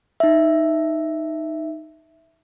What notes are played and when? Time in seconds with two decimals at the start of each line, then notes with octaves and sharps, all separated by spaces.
0.20 D#4 E5